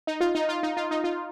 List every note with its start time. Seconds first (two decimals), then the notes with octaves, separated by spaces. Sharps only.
0.07 D#4
0.21 F4
0.35 D#4
0.49 F4
0.63 D#4
0.77 F4
0.91 D#4
1.04 F4